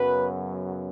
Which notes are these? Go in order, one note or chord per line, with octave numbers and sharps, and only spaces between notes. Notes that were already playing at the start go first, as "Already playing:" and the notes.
Already playing: F#2 C#3 F#3 B3 B4